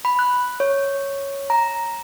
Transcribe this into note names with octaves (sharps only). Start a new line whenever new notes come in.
B5
F#6
C#5
A#5